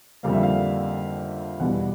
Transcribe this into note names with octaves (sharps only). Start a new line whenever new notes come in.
F2 D3 G3 A#3 F5
E5
F5
E2 B2 G3 B3 F#5